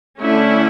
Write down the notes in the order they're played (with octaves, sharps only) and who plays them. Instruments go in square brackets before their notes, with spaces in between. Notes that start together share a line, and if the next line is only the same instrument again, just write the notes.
[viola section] D3 A3 C#4 E4